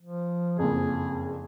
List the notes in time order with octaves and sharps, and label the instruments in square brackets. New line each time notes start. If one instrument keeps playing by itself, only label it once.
[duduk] F3
[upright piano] F#1 F2 [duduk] G#4